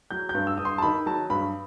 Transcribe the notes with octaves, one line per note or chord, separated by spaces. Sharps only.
F#3 G6
G6
G2
E6
G2 D#6
C6
A5
D#3 B5
F#3 A5
G2 B5